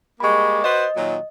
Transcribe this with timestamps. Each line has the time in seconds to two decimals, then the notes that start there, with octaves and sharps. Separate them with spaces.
0.20 G3 G#3 A#3 B5 C#6
0.64 F#4 B4 C5 D#5
0.96 A#2 D#3 F#3